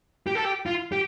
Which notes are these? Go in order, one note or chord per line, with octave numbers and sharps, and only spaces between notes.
G4
A4
G4
F4
G4